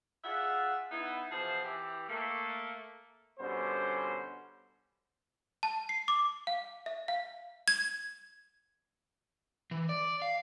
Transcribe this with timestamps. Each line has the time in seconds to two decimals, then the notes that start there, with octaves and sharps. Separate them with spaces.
0.24 F4 G#4 D5 E5 F#5
0.91 B3 D#4 E4
1.31 B2 E3 F3 G#4 C5 A5
1.63 E3 G4
2.08 A3 A#3
3.40 B2 D3 G3 B3 C#4 C5
5.63 A5
5.89 C7
6.08 D6
6.47 F5
6.86 E5
7.08 F5
7.68 G#6
9.71 E3
9.89 D5
10.22 F5